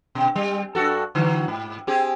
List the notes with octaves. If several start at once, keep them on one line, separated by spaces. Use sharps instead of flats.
B2
G3
G2 F#4 A4
D3 E3 F#3
G#2
C4 G4 G#4